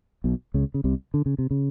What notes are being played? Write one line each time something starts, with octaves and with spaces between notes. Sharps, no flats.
B1 B2
C#2 C#3
C#3
C2 C3
D3
C#3
C3
C#3